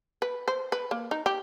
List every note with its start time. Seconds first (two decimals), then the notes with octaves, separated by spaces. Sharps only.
0.22 B4
0.48 C5
0.72 B4
0.91 A#3
1.11 D#4
1.26 G4